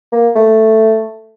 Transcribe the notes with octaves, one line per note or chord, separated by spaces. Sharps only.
A#3
A3